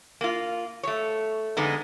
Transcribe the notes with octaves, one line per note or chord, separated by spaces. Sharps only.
A#3 F4
A3 C#5
F2 D3 G#3 B3 D#4